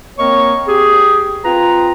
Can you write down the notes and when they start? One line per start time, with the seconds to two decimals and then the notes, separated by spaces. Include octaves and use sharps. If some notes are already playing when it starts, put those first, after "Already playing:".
0.18 A#3 C4 A#4 C#5 D#5 C#6
0.67 G4 G#4
1.44 C4 F4 B4 A#5